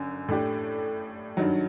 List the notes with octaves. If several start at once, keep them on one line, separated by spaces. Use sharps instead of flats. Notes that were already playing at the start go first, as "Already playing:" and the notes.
Already playing: G1 F#2
A2 A3 D4 G4
G2 D#3 F#3